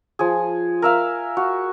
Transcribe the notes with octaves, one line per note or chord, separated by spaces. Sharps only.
F3 G#4
A#4 E5 F5
F#4